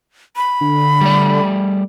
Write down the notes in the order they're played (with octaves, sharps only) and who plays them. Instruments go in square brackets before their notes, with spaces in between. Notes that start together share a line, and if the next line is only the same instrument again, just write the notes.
[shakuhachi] B5
[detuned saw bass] D3
[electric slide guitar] G3 A3 D5